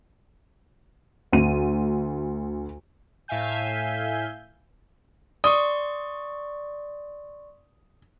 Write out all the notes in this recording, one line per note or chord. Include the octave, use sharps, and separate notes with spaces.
D2 D#7
A2 E5 F5 G#5 G6
D5 C6 C#6 D#6